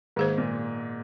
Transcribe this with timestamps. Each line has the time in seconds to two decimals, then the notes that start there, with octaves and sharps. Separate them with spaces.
0.16 G#2 D#3 A#3 G#4 C5
0.38 A#2